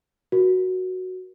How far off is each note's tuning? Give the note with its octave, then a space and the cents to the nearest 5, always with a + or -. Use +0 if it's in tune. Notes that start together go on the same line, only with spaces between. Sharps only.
F#4 +0 A#4 +35